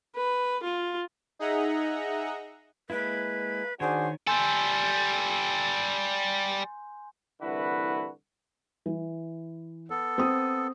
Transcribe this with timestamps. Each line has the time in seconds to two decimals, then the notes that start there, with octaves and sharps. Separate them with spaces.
0.16 B4
0.63 F4
1.39 D#4 G#4 D#5 E5 F#5 A#5
2.90 G#3 A#3 E4 B4
3.80 D#3 D4 F#4 G#4 C5 C#5
4.27 G3 A4 G#5 C6 G6
7.41 C2 D3 E3 E4 F#4 B4
8.86 E3
9.90 B3 A4
10.18 C4 D#6